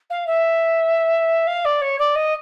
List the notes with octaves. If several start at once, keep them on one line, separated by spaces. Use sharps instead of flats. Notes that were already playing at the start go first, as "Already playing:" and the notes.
F5
E5
F5
D5
C#5
D5
D#5